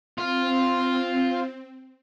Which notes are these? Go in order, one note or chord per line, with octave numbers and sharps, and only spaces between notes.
C4 F4